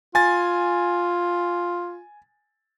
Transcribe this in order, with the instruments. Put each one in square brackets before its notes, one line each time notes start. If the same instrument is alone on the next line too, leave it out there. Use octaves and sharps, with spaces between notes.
[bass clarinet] F4 [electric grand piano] G#5 A6